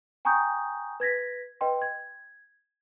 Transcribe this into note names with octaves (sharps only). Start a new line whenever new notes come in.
G5 G#5 A#5 C#6 D#6 G6
B4 G#6 A#6 B6
B4 D#5 G5 C6
G#6